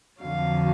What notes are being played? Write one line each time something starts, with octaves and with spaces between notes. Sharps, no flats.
F2 D3 F#3 F5